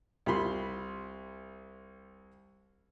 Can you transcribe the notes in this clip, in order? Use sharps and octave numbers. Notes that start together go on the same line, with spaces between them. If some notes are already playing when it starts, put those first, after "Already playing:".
C2 F4 B5 C6